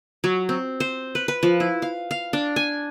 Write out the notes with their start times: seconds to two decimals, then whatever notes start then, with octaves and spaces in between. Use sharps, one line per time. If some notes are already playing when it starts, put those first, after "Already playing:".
0.24 F#3
0.49 C4
0.80 C5
1.15 B4
1.28 B4
1.43 F3
1.60 E4
1.82 F5
2.11 F5
2.33 D4
2.56 G#5